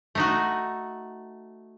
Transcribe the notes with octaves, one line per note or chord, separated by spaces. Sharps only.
A3 D#4 F#4